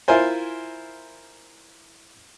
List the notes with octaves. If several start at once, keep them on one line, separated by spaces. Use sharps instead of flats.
E4 F4 A#4 C5 G#5